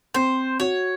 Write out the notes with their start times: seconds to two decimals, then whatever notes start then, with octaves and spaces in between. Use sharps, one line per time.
0.14 C4 C5
0.60 F#4 C#5